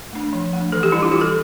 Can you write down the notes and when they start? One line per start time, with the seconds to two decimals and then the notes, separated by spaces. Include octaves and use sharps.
0.13 A3 D4
0.33 F3
0.53 A3 D4
0.72 E3 A4
0.83 G4
0.92 G3 D4 E4
1.02 F4
1.12 E3 G4
1.21 A4